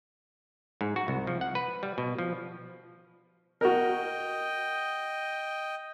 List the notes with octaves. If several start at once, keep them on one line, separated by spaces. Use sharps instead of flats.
G#2
F#4
C2
F3
F#5
B4
G3
B2
F3
F#4 A#4 D#5 G5